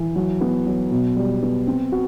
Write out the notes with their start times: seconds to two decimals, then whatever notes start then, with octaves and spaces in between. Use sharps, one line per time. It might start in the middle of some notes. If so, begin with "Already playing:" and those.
Already playing: E3
0.15 F#3
0.41 B3
0.66 F#3
0.91 B2
1.16 G3
1.42 B3
1.67 C4
1.92 F#4